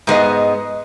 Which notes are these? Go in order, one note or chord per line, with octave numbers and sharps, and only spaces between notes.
G#2 G#3 B3 D#5